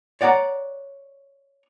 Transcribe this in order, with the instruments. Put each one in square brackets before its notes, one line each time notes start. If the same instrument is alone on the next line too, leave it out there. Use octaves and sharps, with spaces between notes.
[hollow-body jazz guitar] C#5 D5 F#5 G#5 A#5